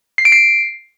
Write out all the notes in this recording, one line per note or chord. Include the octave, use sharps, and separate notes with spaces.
C7
D7
C7